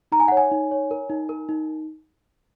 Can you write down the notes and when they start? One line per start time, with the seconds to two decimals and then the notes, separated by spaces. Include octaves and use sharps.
0.12 D#4 A#5
0.20 G#5
0.28 F#5
0.32 C#5
0.37 G#5
0.51 D#4
0.71 C#5
0.91 A#4
1.09 D#4
1.29 A#4
1.49 D#4